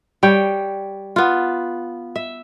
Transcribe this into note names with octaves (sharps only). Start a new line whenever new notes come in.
G3 C#5 G5
B3 F4
E5